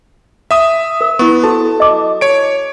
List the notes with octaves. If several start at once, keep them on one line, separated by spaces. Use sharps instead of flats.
E5 D#6
A#4
B3 E4 C#6
F#4 A4 A5
D#5 D6
C#5 D7